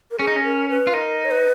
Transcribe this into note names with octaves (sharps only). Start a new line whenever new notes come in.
A#4
C#4 G#4
D#4
C#4
A#4
B4
F4
D#4 A#4
C#5
B4